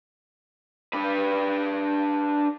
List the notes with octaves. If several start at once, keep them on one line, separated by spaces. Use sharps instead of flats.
D4 B4